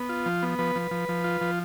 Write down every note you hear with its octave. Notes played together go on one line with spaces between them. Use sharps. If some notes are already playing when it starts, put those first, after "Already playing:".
Already playing: B3
F4
F3
B3
F3 B4
F3
F3
F3
F4
F3